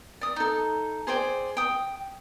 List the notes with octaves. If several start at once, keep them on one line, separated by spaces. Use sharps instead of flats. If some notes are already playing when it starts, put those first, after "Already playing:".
D5 D#6
D#4 A4
G#4 C5 D5 G5
G5 D#6